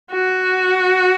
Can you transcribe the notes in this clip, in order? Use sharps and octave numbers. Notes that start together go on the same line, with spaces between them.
F#4